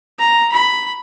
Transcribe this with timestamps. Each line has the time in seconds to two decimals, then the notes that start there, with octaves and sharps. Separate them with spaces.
0.19 A#5
0.52 B5